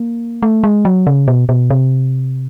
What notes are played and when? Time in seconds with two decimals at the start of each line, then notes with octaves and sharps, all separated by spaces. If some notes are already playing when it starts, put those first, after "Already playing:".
Already playing: A#3
0.42 A3
0.64 G#3
0.85 F#3
1.07 C#3
1.28 B2
1.49 B2
1.70 C3